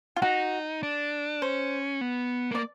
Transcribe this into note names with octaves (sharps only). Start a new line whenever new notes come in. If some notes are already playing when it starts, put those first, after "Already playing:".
F4
D#4 F#4
D4
C#4 C5
B3
A#3 D5